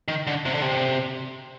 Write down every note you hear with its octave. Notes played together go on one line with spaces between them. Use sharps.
D#3
D3
C3
D3
C3